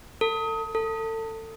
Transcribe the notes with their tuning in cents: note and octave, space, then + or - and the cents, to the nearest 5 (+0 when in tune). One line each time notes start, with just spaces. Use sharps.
A4 +40
A4 +30